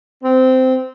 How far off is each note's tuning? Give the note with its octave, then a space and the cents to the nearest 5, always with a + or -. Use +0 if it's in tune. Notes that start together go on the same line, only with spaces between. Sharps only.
C4 -15